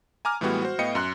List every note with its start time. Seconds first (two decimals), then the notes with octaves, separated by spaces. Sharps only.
0.25 G#5 A#5 D6 F6
0.41 A2 E3 G3 G#3 B3 F#4
0.62 F#4 C5
0.79 A2 B3 D#5 F5 G5 C#7
0.95 F#2 C6 F#6